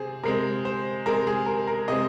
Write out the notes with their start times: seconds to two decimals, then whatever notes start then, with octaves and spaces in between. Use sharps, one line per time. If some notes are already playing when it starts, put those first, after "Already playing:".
Already playing: C3 C4 G#4
0.24 C3 G#3 C4 A#4
0.65 C5
1.06 C3 G#3 C4 A#4
1.27 G#4
1.46 A#4
1.67 A#4
1.88 C3 G#3 C4 D#5